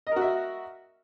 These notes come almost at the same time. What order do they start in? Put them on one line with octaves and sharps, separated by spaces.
D#5 A#4 F#4 E5